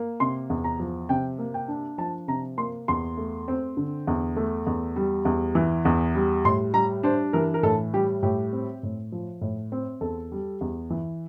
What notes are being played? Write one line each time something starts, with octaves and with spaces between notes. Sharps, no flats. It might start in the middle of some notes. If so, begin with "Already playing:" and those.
Already playing: A#3
C3 C6
E2
A#5
F3
C3 G5
A#3
G5
D4
F3 A5
C3 A#5
A#3 C6
E2 C6
A3
C4
D3
E2
A3
E2
G3
E2
E3
E2
G3
A2 C6
G3 A#5
D4 C5
E3 A#4
A#4
A2 A4
G3 G4
A2 G4
C4
A2
F3
A2
C4
E2 A4
G3
E2
E3